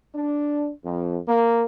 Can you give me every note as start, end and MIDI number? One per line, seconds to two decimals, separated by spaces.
0.15 0.70 62
0.84 1.17 41
1.28 1.65 58